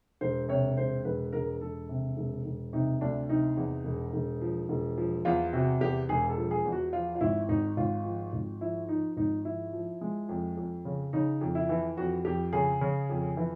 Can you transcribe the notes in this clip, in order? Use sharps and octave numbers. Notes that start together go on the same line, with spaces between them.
E1 C5
C3 C#5
E1 C5
E1 B4
E1 A#4
E1 A4
C3
E1
E1
C3 D#4
D2 D4
C3 D#4
E2
E1
E1
F3
E1
F3
E2 F4
C3 F#4
E2 G4
E1 G#4
A4
F3
G#4
E2
F#4
F3 F4
F4
G#1 E4
G#1 D#4
G#1 F4
F3
G#1
F3 E4
F3 D#4
G#1 D#4
F3 E4
F3
G#3
F2
F2
C#3
C#3 D#4
F2
E4
E3
F2 F#4
F2 G4
C#3 G#4
C#3
F2
E3